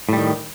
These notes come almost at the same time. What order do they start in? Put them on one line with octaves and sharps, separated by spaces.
A2 G3 D#3